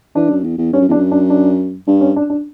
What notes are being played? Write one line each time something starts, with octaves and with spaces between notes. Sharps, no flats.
E3 D4
F#2
E2
E2
G2 C#4
F#2
E2 D4
F#2
D4
D4
G2 D4
C#4
D4
D4